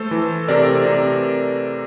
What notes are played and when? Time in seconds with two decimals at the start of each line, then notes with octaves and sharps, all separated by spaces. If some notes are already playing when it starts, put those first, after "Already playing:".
Already playing: A3 A4 C5
0.11 E3
0.48 C3 A#4 D5
0.86 C3